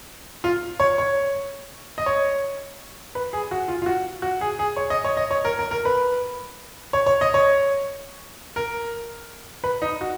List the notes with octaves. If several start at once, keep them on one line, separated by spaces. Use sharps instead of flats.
F4
C#5
C#5
D#5
C#5
B4
G#4
F#4
F4
F4
F#4
F#4
G#4
G#4
C#5
D#5
C#5
D#5
C#5
A#4
A#4
A#4
B4
C#5
C#5
D#5
C#5
A#4
B4
D#4
F#4